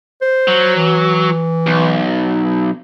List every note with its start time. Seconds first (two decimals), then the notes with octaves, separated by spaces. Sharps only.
0.21 C5
0.48 F#3
0.76 E3
1.66 B1